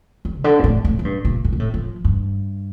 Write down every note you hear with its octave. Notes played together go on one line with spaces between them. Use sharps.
G3
C3
D3
A#2
A2
A2
A2
G2
A#2
A2
A#2
A2
F3
G2